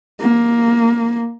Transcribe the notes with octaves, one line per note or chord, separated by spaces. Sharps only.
A#3